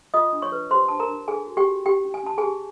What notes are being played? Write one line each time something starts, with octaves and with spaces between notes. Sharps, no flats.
F4 D#5 D#6
D4
C#5 C#6
B4
G4 C5 C6
D4 A5
A#4 A#5
D4
G#4 A4 G#5
F#4
G4 G5
F#4
E4 G4 G5
C#4
G#5
C#4 A5
G#4 G#5
G4